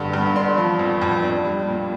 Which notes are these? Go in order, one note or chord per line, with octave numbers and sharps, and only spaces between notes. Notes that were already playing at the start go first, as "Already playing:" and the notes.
Already playing: G2 D3 G3
G2
D4 C6
F3
F2
F2
D4
G3
A#2